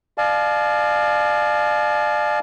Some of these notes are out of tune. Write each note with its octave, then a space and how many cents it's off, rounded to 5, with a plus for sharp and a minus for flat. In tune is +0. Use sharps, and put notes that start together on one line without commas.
D5 +35 F5 +0 A5 -45